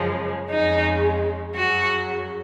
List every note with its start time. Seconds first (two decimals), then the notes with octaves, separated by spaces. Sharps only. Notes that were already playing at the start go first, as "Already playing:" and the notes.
Already playing: F#2 C#3 F3 G#3
0.50 F2 C#3 G#3 D#4
1.55 F#2 C#3 F#3 F#4